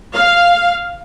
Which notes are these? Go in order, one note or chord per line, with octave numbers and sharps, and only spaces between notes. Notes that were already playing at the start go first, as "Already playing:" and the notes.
F5